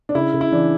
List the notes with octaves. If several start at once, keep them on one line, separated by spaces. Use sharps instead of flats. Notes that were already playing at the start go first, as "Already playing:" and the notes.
D4
C#3 E4
C#3
E4
E3 D4